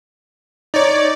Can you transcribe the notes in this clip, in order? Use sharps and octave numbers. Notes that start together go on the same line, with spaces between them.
D#4 C#5 D5